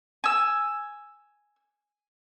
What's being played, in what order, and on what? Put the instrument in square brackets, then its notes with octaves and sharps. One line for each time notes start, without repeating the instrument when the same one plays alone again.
[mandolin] G#5 E6